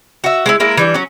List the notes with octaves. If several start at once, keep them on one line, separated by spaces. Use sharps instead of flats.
F#4 E5
G#3 A#3 E4
G#3 A#3 E4 A#4
E3 G3 D4
F#3 C#4